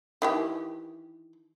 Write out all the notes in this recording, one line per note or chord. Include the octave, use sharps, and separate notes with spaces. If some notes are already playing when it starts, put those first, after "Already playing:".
D#3 E3 G4